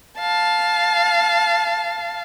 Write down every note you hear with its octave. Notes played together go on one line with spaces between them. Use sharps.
F5 A5